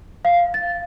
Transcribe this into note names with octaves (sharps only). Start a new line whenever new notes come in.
F5
A6